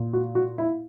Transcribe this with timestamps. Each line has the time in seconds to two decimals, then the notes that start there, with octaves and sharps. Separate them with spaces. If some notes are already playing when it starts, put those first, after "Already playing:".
Already playing: A#2
0.13 F#4
0.35 F#4
0.58 E4